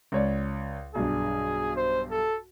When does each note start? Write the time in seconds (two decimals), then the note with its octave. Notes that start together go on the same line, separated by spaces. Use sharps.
0.12 C#2 C#5 D5
0.95 B1 G2 G#4
1.76 C5
2.11 A4